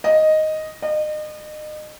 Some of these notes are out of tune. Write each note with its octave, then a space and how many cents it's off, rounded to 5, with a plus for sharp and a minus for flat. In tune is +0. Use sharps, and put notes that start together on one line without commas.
D#5 +0
D#5 -35